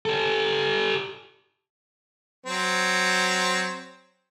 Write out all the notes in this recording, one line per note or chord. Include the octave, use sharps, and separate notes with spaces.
G4 A4
F#3 C4